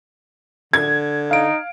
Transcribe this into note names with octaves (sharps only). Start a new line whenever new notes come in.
D3 G#6
D#4 F5 D7